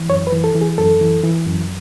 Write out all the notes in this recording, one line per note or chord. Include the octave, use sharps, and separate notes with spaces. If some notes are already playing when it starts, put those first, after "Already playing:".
Already playing: E3
F#2 C#5
B4
E3
A4
E3
G#4
F#2 A4
E3
E3
F#2